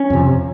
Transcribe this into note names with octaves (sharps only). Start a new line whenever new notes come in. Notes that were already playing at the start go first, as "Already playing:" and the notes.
Already playing: C#4
F2 C3